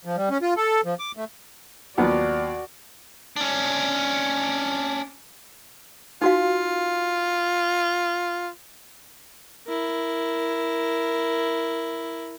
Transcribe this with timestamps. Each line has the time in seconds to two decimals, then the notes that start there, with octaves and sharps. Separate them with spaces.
0.05 F3
0.16 G3
0.30 C#4
0.42 F4
0.57 A4
0.85 F3
0.99 D6
1.17 A3
1.98 D#2 F3 F#3 B3 F#4 D5
3.36 C#4 D4
6.22 D#4 F4 F#4 F5
9.67 E4 A#4